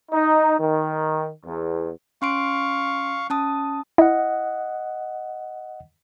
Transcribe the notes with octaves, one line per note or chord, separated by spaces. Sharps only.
D#4
D#3
E2
C#4 F5 C6 C#6 D7
C#4 A5 D#6
E4 D#5 F#5